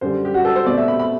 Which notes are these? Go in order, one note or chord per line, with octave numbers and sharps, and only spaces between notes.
F#2 D3 G3 C5
G4
F#4
A4
C5
B2 A3 C4 D5
E5
B5
B5